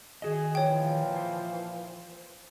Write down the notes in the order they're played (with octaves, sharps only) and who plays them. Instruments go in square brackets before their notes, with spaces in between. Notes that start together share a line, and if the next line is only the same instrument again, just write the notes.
[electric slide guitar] D#3 F#4 D#5 [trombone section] G#4
[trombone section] A#2 E3 F3 [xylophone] C#5 G5
[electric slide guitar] C5